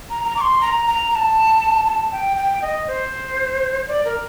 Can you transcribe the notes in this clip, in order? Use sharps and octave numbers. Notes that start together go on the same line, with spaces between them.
A#5
A#5
D6
C6
A#5
A#5
A#5
A5
A5
G5
G5
D#5
C5
D5
A#4